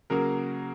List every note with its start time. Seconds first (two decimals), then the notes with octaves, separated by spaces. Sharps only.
0.10 C#3 F#3 A#3 A#4